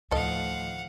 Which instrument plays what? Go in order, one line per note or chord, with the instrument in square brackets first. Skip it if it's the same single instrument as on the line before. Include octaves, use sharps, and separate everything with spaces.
[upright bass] D2 D#3 [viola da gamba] A2 F3 [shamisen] A4 D#5 [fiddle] F5 F#5